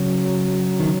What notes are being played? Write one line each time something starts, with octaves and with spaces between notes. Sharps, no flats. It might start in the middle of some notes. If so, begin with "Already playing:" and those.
Already playing: C#3 F#3
D#3